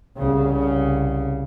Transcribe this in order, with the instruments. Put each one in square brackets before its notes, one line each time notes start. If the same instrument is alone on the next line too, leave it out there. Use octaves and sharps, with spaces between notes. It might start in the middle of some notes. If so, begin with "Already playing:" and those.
[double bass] C2 C#3